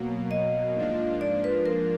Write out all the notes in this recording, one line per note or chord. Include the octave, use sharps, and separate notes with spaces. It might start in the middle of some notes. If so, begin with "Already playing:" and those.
Already playing: B2 F#3 A#3
D#5
G#2 F3 A#3 D4 F4
D5
B4
A#4